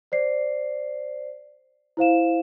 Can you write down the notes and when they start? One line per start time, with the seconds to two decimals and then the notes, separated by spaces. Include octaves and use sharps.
0.12 C5 D5 C7
1.97 E4 C5 F5 E7